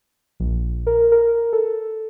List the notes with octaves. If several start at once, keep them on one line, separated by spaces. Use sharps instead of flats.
A#1
A#4
A#4
A4